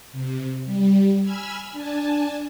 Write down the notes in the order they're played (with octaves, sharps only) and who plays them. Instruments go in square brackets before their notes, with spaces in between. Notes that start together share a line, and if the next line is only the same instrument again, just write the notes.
[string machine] C3
G3
G#5 B5 E6 F6 G#6
D4 G#5 A5